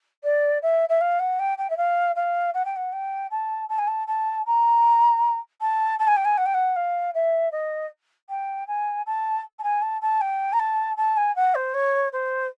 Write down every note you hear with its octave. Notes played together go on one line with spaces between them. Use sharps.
D5
E5
E5
F5
F#5
G5
G5
E5
F5
F5
F#5
G5
F#5
G5
A5
A5
G#5
A5
A5
A#5
A5
A5
G#5
G5
G#5
F#5
G5
F#5
F5
E5
D#5
G5
G#5
A5
A5
G#5
A5
A5
G5
A#5
A5
A5
G#5
F#5
C5
C#5
C5